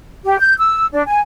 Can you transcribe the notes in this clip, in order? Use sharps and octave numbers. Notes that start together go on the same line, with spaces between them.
G4
G6
E6
D4
G#5